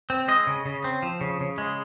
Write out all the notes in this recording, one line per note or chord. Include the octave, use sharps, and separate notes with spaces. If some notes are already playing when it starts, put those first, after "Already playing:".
C4
G#3 D#5
C#3
C#3
C4
F3
C#3
C#3
G#3